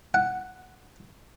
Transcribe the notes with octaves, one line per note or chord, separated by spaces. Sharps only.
F#5